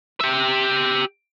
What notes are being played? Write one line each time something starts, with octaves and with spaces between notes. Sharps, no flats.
G4 E5